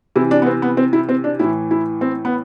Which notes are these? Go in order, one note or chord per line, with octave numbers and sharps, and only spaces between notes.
C3 E3 E4
D4
B3
C4
B3
C4
E4
C4
D4
A2 E3 E4
E4
C4
B3